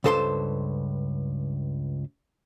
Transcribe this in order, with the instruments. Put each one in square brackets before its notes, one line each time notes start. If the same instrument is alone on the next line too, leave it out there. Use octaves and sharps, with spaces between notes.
[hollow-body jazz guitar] C#2 G2 A4 C5 A5 C6